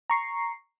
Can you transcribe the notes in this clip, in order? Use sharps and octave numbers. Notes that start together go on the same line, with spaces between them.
A#5 C#6 C7